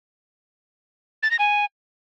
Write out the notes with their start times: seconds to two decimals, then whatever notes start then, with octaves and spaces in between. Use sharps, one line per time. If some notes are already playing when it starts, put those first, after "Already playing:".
1.23 A6
1.31 A#6
1.39 G#5